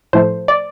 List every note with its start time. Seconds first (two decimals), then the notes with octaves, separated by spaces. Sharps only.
0.13 A2 F3 A3 C5
0.48 D5